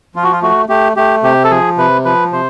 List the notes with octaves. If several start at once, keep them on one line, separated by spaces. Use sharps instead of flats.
F3 F4
F#4
F4
A3 F#4
A3 G4
A3 G4
C3 G4
A4
F3 G#4
C3 B4
F3 B4
C3 C5